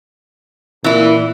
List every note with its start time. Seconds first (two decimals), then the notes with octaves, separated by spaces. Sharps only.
0.84 A#2 E3 E4